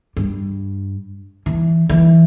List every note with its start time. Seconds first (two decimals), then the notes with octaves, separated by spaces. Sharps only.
0.17 G2
1.46 E3
1.89 E3